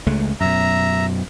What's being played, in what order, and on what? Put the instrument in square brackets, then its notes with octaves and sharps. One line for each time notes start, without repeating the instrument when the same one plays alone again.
[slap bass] C#2 G#3 A3
[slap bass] F#2 B2 [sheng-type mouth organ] E5 A#5